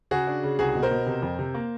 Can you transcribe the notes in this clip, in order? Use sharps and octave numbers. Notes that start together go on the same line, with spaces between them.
C#3 F#4 G#4
D4
C#3
C2 F#4 G#4
B2
A#4 C5
B2
C3
F2
C3
A#3